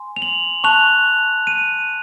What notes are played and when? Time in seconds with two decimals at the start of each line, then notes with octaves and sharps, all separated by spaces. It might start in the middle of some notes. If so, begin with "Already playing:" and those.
Already playing: G#5 C6
0.16 F7
0.22 F#7
0.64 A5 C#6 F#6 F7
1.47 D#7